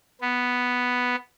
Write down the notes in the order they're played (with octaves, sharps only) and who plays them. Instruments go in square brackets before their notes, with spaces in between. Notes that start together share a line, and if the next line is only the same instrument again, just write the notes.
[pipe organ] B3